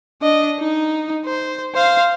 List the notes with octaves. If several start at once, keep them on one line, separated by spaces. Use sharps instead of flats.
D4 D#5
D#4
C5
C5 F5